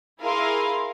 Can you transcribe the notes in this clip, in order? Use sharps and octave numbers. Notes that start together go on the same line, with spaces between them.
E4 G#4 A#4 F5 C6